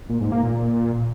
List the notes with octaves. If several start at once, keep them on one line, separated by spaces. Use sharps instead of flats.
A#2
G#2
A#3
A#2